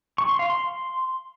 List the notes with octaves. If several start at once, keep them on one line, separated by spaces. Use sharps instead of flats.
C#6
C6
F5
C6